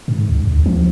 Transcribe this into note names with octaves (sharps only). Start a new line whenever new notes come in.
G#2
C#2
D2
F3